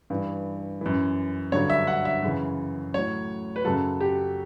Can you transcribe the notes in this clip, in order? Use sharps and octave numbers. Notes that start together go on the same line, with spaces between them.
G2 E3
F#2 E3
G2 D3 F#3 C#5
E5
F#5
E5
F#2 C#3 E3
A2 F#3 C#5
B4
F#2 C#3 F#3 A4
G4